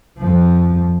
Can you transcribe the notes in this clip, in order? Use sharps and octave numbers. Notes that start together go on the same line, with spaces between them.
F2 F3